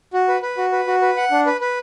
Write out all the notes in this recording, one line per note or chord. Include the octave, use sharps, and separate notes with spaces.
F#4
B4
B4
F#4
B4
F#4
B4
F#5
D4
B4
B4